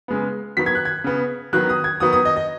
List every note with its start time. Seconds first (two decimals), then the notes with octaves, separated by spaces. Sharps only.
0.08 C#3 G#3 B3
0.57 D#3 F#3 B3 B6
0.66 G#6
0.75 F#6
0.85 G#6
1.04 C#3 B3
1.53 D#3 F#3 B3 F#6
1.69 D#6
1.84 G#6
2.00 D#3 F#3 B3 D#6
2.12 D#6
2.25 D#5
2.36 D#5